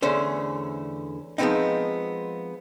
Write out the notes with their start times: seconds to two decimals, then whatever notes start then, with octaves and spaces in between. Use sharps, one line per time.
0.02 E2 D3 A3 C#4 C5
1.38 F3 G#3 A3 B3 C4 D#4